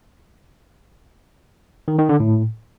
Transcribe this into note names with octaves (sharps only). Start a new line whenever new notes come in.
D#3
D#3
D3
A2